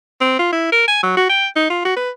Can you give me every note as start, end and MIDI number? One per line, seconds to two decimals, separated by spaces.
0.21 0.34 60
0.39 0.52 65
0.52 0.72 64
0.72 0.85 70
0.88 1.00 80
1.03 1.13 54
1.17 1.25 66
1.29 1.47 79
1.56 1.68 63
1.70 1.84 65
1.85 1.94 66
1.97 2.10 71